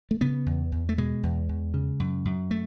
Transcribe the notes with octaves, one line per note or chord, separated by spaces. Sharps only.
A3
C#3 B3
E2
E2
A3
B2 G#3
E2
E2
C#3
F#2
F#2
A3